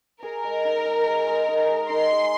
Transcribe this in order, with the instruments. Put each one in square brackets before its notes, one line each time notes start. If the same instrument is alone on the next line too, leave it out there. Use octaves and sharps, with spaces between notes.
[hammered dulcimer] G#4 [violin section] A#4
[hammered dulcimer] G#3
D#4
G#3
G#4
G#3
D#4
G#3
[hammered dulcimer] D#4 [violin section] C6
[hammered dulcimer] G#4